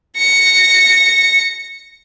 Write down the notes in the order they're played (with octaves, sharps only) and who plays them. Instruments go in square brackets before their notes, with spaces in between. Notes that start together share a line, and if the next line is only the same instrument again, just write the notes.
[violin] A#6 C#7